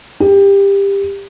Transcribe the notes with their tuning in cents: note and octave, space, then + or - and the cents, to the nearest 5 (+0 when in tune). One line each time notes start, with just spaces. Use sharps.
G4 +20